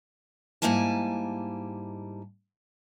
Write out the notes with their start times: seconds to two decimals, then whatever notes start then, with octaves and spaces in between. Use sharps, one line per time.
0.62 G#2 G3 A#3 E4 G#5 A5